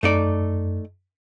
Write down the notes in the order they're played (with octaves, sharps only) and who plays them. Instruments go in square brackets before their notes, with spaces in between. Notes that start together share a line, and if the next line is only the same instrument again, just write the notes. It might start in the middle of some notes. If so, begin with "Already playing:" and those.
[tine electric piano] F#2 [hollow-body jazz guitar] A3 D#4 D5